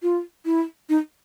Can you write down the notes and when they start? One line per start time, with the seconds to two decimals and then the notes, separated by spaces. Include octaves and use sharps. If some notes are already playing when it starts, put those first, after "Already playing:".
0.03 F4
0.46 E4
0.89 D#4